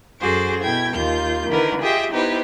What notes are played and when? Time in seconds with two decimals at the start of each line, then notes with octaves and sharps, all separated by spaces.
0.20 F#2 F#4 G#4 A4 C5 D6
0.62 B2 E4 G5 G#6
0.94 D#2 F4 G6
1.50 D3 D#3 E4 A#4 B4
1.81 F4 G4 G#4 D#5 E5 G5
2.12 B3 D#4 E4 G4 B4 C5